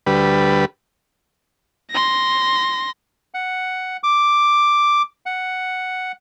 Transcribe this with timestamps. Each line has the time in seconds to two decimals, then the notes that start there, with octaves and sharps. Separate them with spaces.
0.06 D2 G3 B4
1.91 C6 A#6
3.34 F#5
4.03 D6
5.26 F#5